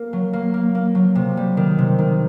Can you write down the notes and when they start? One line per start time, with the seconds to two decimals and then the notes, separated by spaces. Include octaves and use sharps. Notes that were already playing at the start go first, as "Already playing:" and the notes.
Already playing: A#3
0.13 F#3
0.33 A#3
0.54 A#3
0.75 A#3
0.95 F#3
1.15 C3
1.37 G3
1.57 D#3
1.79 C3
1.99 D#3